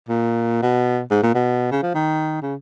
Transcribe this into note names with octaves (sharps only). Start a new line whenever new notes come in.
A#2
B2
G#2
A#2
B2
C#3
F3
D#3
C#3